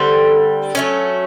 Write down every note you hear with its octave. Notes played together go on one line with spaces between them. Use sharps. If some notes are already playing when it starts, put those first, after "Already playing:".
Already playing: D3 G3 C4
F#3 A3 C#4